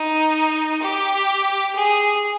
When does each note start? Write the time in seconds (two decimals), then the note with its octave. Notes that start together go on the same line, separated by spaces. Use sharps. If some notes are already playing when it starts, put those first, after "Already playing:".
Already playing: D#4
0.82 G4
1.75 G#4